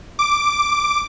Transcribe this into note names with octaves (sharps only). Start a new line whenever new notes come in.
D6